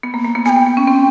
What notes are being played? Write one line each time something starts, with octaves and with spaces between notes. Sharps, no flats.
B3
A#3
A#3
B3
B3 G#5
G5
B3
B3
C#4
C4